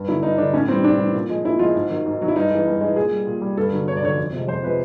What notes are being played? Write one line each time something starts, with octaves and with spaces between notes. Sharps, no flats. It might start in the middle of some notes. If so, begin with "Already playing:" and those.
Already playing: G2
D3 F#3 E4
G2 D#4
D3 F#3 D4
A2 C#4
E3 G3 C4
A2 D4
E3 G3
A#2
F3 G#3
A#2 E4
F3 G#3 F4
G#2
D#3 F#3
G#2
D#3 F#3
E4
G2 D#4
E3 G#3
G2
E3 G#3
A#2 G#4
G3
A#2
G3
G2 A4
D3 F#3
G2 C#5
D5
D3 F#3 C#5
F2
C3 F3 G#3
F2 C5
C3 F3 G#3 B4